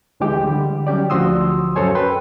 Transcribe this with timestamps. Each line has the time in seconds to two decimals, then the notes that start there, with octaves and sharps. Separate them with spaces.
0.20 D2 D3 E3 G#3 G4
0.47 D3 G3
0.87 F#3 C#4 G4 D5
1.10 D2 F3 F#4 C6 D#6 E6
1.76 F#2 F#4 A4 C5 C#5 G#5
1.95 A#4 B4 G5 C6